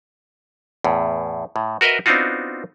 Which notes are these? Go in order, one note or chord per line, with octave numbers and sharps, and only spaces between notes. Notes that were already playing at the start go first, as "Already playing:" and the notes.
E2 A2
A2
F#4 A#4 B4 D#5 E5
B3 C4 D4 D#4 F4 F#4